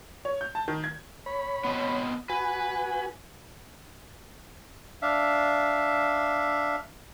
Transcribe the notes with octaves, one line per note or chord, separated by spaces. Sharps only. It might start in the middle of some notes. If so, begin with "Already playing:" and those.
C#5
G6
A5
D#3
G#6
C#5 B5
B3 C4 D#5
F#4 B4 G#5
D4 E5 F5